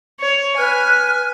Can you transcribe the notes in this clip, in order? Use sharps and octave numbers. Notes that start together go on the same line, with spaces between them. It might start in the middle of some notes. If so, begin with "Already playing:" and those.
C#5
B4 G#5 F6 F#6